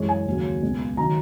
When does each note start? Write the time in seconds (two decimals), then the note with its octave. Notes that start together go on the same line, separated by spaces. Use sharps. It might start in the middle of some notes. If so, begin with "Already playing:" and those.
Already playing: F#2 E3 G#3 C#5
0.09 G#5
0.26 D#2 C#3 F#3
0.62 C#2 B2 G#3
0.97 D#3 F#3 A#5